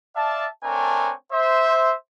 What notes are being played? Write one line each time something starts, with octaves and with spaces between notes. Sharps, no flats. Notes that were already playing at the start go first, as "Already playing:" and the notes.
D5 E5 F5 A5
A3 C4 D4 A#4 C#5 G#5
C5 E5